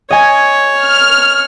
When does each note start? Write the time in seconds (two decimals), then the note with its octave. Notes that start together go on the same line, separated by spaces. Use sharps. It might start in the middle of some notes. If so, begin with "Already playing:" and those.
0.11 C#5 D#5 G#5
0.82 F6